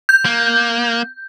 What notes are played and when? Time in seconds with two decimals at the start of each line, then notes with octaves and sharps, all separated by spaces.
0.09 G6
0.25 A#3